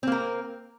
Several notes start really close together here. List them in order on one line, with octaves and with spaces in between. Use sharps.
C4 A#3 A#4